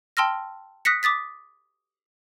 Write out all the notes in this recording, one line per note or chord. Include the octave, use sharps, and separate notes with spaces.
G5 A5 C6 E6 F6 A#6
D#6 F#6 A#6 B6 C#7
D6 D#6 A6 B6